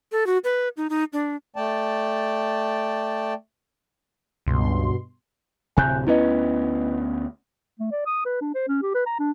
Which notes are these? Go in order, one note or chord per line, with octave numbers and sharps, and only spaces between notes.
A4
F#4
B4
D#4
D#4
D4
A3 D5 G5 A5
C#2 G2 B2 C6
D1 C3 G#5 F#6 G6
D2 B3 C#4 E4 B4 D#5
A3
D5
D#6
B4
D4
C5
C#4
G4
B4
A#5
D4